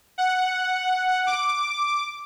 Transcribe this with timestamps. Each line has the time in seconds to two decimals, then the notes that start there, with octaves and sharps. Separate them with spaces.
0.18 F#5
1.27 D6